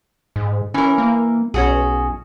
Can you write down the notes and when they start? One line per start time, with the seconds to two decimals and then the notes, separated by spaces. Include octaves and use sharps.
0.36 G#2
0.74 E3 C#4 A#4
0.98 A#3
1.54 B1 C#4 F#4 G#4